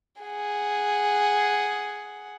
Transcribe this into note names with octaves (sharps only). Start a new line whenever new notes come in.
G#4 F#5